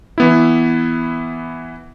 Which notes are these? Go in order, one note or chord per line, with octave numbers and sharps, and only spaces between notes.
E3 B3 E4